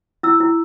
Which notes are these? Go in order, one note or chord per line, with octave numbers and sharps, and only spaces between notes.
E4 E6
E4